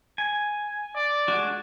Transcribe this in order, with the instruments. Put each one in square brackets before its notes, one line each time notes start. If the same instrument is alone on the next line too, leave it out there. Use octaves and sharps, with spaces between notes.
[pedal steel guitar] G#5
[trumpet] D5
[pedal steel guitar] G#3 D4 F#4